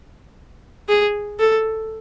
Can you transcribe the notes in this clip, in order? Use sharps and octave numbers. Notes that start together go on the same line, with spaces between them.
G#4
A4